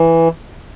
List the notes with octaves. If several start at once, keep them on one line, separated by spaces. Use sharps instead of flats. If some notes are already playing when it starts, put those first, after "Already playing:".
Already playing: E3